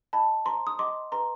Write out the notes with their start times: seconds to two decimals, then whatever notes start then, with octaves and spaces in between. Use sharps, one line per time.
0.13 D#5 G5 A5 B5
0.46 C5 A#5 C6
0.67 D#6
0.79 D#5 F#5 C6 D6
1.12 B4 A#5 C6